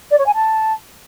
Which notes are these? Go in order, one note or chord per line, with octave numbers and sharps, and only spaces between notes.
D5
C#5
G#5
A5